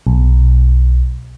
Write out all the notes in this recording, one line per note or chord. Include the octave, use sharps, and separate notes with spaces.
B1